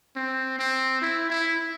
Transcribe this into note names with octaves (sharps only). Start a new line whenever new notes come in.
C4
C4
E4
E4